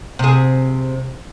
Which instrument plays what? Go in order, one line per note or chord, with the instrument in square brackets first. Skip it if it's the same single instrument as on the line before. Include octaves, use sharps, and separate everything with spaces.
[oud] C3 G#4